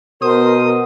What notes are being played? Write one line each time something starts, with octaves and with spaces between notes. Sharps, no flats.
B2 A#4 C5 D#6